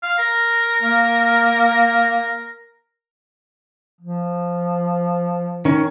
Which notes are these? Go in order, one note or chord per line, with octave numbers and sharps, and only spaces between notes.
F5
A#4
A#3
F3
D#3 C#4